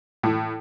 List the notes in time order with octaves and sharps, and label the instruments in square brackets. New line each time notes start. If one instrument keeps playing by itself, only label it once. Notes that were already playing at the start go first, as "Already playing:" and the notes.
[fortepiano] A2